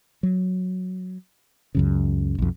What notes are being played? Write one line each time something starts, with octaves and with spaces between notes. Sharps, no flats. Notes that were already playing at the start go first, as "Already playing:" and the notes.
F#3
C#2 F#2 C#3
B1 F2